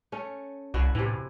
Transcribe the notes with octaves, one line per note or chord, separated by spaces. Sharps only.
A3 C#4
C2 E4 F#4
A2 C3 E3